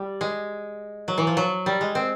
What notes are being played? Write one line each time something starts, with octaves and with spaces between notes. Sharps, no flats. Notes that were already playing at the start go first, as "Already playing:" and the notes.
Already playing: G3
G#3
F#3
E3
F3
F#3
G3
G#3
C4